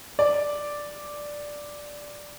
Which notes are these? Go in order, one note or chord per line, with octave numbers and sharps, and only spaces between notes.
D5